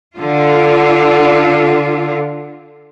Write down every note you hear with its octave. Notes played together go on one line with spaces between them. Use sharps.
D3 F4